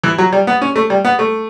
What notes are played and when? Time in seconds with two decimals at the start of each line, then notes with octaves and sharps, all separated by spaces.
0.04 E3
0.18 F#3
0.32 G3
0.47 B3
0.62 C#4
0.76 A3
0.90 G3
1.05 B3
1.19 A3